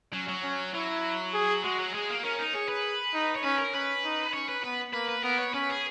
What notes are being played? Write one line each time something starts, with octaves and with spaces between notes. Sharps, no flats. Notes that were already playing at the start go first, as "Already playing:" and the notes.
F#3 C#4
F#3
C#4
F#3 E4
G#4
G#3 F#4
F#3
G#3 G#4
A#3
C#4 A#4
D#4
G#4 C#5
B4
D#4
C#5
C#4 B4
A#4
C#4 B4
D#4
C#4 C#5
B4
B3 B4
A#3 B4
B4
B3 A#4
C#5
C#4 B4
G#4